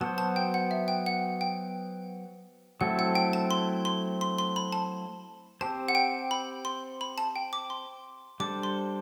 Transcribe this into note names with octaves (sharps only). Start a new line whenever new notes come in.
F#3 B3 F#4 C5 A5
A5
G5
F#5
E5
G5
F#5
G5
F#3 A3 C4 E4 A4 F#5
F#5
G5
A5
C6
C6
C6
C6
B5
A5
C4 G4 C5 A5
F#5
G5
B5
C6
B5
A5
G5
D6
C6
G3 D4 A4 C5 D6
C6